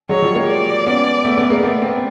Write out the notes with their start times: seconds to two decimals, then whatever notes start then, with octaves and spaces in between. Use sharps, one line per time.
0.09 F#3 G#3 C#5
0.22 F3 G3
0.35 G#3 A#3
0.47 D5
0.87 B3 C#4
1.25 A3 B3
1.38 A3 B3
1.50 G#3 A#3
1.63 A3 B3
1.82 A#3 C4